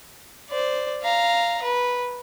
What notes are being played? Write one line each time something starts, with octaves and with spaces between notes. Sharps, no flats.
C5 D5
F5 A#5
B4